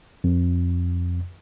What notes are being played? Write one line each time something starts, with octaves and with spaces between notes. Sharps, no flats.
F2